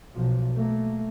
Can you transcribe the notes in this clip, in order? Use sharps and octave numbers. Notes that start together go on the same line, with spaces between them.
B1 F3
A3 A#3